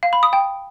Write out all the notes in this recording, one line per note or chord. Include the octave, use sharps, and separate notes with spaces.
F5
B5
D#6
G5